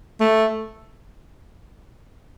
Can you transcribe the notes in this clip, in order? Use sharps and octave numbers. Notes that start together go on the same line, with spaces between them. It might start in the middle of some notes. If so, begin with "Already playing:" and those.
A3